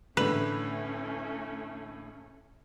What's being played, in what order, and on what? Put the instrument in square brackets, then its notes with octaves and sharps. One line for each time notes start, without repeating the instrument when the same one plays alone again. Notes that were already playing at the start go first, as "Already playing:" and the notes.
[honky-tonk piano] A2 D3 E3 [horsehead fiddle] A3 C#4 [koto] B4